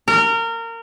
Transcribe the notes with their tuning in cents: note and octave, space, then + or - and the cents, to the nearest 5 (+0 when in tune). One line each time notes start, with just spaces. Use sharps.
A#4 -25